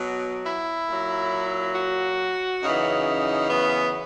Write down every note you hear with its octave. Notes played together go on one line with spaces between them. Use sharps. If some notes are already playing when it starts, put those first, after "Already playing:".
Already playing: B2 F#3
E4
A#2 F#3
F#4
F#2 C#3 E3 D#4
B3